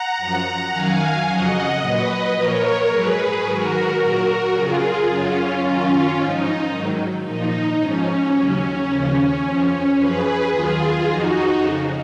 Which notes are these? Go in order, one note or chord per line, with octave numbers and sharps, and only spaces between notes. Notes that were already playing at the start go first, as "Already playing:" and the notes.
Already playing: F#5 A#5
F#2 F3
F#2 D#3 F#3 F5 G#5
F2 C#3 F#3 D#5 F#5
A#2 F#3 B4 D#5
A#2 F3 A#4 C#5
G#2 F#3 G#4 B4
G#2 D#3 F#3 F#4 A#4
A#2 F#3 F#4 A#4
F2 C#3 F#3 F4 G#4
F#2 C#3 F#3 C#4 F4
F#2 D#3 F#3 C#4 F4
G#2 F3 D#4
G#2 D#3 F#3
A#2 F3 D#4
G#2 F3 C#4
D#2 C#3 F#3 C#4
D#2 C#3 F3
F2 F3
F#2 F3 G#4 B4
D#2 D#3 F#3 F4 G#4
F2 F3 D#4 F#4
F2 C#3 F3